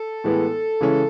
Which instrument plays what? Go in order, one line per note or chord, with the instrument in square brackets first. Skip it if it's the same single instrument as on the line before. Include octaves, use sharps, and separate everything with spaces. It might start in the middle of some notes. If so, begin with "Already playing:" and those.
Already playing: [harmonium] A4
[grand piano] A2 E3 G#3 B3
C#3 E3 G#3 C#4